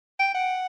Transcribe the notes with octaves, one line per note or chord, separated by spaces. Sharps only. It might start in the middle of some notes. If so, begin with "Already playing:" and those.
G5
F#5